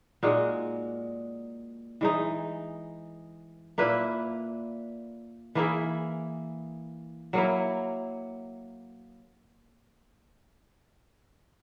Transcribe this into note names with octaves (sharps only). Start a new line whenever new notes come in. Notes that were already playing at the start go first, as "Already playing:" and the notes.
A#2 G#3 D#4 F#4
E3 G#3 D#4
A#2 A#3 E4 B4
E3 A#3 E4 G#4
F#3 A#3 E4